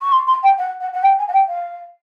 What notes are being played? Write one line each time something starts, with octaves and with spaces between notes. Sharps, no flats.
C#6
C6
C6
G5
F#5
F#5
F#5
G5
G#5
F#5
G5
F5